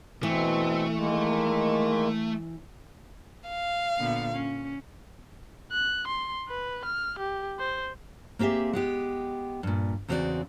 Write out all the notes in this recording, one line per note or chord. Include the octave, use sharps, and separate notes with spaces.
B2 E3 A3 C4
D#3 G#3 A#3
F5
A#2 D3 B3
C#4
F#6
C6
B4
F6
G4
C5
A#3 C4 G4 G#4 E5
G#3 B3 G4
G2 A#2
E2 C#3 C4 F#4 G#4 D5